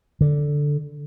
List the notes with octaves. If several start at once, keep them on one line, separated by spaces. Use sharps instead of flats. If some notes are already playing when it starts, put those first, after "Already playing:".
D3